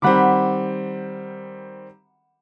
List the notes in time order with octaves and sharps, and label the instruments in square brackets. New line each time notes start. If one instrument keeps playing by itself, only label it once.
[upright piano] D#3 G3 C4 [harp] F#5 B5 D6